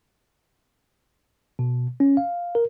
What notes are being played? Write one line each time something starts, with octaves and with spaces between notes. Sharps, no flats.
B2
C#4
F5
A#4